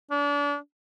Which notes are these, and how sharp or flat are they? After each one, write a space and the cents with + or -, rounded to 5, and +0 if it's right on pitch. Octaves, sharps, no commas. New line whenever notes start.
D4 -35